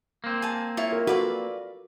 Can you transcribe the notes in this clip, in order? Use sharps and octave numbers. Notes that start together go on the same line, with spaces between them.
A#3 C4
G#5 A5
E4 F4 C#5
A#4
F4 F#4 A4 B4 D5 F5